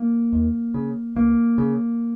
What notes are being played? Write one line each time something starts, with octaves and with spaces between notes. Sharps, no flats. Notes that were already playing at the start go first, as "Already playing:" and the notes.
Already playing: A#3
D#2
C#3
C#2 A#3
C#3